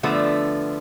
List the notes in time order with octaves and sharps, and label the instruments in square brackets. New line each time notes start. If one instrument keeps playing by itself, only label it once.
[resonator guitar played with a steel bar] D3 F3 A3 B3